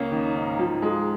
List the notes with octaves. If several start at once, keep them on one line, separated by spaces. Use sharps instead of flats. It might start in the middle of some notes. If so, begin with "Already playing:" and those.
Already playing: C#2 A#3 C#4
D#3
G#2
F3
G#3